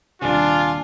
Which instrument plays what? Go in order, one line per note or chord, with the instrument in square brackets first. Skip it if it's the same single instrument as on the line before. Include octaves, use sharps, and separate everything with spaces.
[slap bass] D#1 C3 [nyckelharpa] D4 [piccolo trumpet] F4 [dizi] G#5